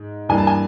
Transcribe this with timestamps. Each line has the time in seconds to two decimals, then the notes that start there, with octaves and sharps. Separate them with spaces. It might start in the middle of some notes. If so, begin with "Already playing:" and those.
Already playing: G#2
0.29 G2 E3 G3 A#3 G#5
0.38 A5
0.47 G#5